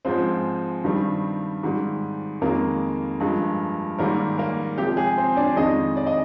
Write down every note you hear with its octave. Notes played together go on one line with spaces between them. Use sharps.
G#2 F3 G#3 C4 C5
G2 D#3 G3
G#2 D#3 G3
F2 D#3 G#3 A#3 A#4
G2 F3 G#3
G#2 D#3 G3 A#3 A#4
A#3 A#4
C3 F3 G#3 G4
G#4
C4 C5
D4 D5
F2 D#3 G#3 D#4 D#5
D5
D#5